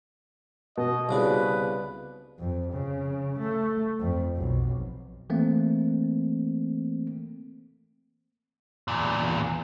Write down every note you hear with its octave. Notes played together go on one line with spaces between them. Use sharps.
B2 D#5
C2 C#3 D4 B4
F2
C#3
A3
F2
B1
E3 A3 A#3 C4
E2 A#2